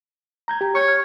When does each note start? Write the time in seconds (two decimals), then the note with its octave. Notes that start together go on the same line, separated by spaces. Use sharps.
0.48 A#5 G6 G#6
0.61 G4
0.75 C#5 C#6 G6
0.88 F6